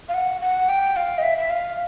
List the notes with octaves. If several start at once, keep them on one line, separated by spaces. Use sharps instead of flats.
F5
F#5
F#5
G5
F5
D#5
E5
E5
F5